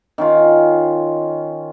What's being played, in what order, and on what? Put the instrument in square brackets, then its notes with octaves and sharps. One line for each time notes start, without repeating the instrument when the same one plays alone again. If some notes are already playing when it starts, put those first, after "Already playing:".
[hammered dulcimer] D#3 C#4 F4